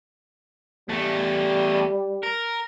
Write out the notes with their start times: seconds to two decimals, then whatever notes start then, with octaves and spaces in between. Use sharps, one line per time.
0.89 E2 G3 A3
2.23 A#4